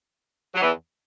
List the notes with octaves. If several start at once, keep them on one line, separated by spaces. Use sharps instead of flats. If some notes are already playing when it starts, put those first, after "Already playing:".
F#3
E2 E3